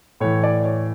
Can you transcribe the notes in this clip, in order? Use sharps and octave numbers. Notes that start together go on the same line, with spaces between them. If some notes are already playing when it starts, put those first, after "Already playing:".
A2 E3 C#5
D5
C#5